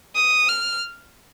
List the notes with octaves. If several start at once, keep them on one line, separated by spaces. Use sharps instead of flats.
D#6
F6